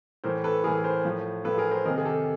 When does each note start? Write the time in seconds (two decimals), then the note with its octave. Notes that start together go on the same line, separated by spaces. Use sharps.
0.24 A2 E3 A#4 C5
0.44 A4 B4
0.64 E3 G#4 A#4
0.67 A2
0.84 A#4 C5
1.05 A2 F3
1.44 A2 F3 A4 B4
1.58 G#4 A#4
1.71 A#4 C5
1.85 C3 D#3 G#4 A#4
1.98 G#4
2.05 G4 A4